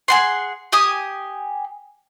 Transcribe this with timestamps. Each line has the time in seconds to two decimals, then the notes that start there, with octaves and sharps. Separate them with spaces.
0.08 G#4 F#5 C6
0.72 G4 G#5 D#6